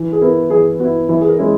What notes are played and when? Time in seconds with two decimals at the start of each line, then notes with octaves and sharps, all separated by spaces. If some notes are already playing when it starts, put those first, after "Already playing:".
Already playing: E3
0.12 G#4
0.21 B3 E4 A#4
0.50 E3 G#4
0.80 B3 F#4
0.85 E4
1.09 E3 E4
1.21 G#4
1.29 A#4
1.38 G#3 C#4 E4